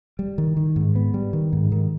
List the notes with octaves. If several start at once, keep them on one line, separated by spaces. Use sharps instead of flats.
G3
D#3
D#3
G#2
B3
G3
D#3
G#2
D#3